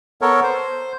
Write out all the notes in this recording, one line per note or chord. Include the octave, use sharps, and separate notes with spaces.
B3 A4 A#4 C#5
C5